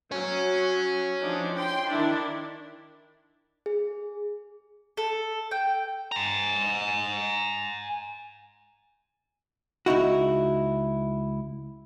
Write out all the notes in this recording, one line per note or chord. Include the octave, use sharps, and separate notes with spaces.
F#3 C#5 G#5
F3 D4 D#4
G5 C6
D#3 D4 E4
G#4
A4
G5
G#5 A#5
C#2 D#4 E4 F#4